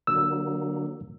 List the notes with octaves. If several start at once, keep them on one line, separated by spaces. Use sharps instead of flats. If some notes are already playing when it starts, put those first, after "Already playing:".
D3 F#3 A#3 E6